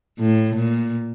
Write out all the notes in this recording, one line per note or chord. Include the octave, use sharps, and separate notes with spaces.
A2
A#2